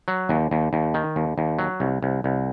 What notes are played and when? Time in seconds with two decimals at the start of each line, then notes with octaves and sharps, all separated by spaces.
0.08 F#3
0.29 D#2
0.51 D#2
0.73 D#2
0.94 D#3
1.16 D#2
1.38 D#2
1.59 F#3
1.80 C2
2.03 C2
2.24 C2